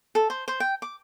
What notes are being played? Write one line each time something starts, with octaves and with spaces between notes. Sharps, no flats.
A4
C5
C5
G5
D6